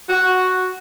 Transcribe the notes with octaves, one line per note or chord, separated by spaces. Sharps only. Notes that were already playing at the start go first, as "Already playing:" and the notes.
F#4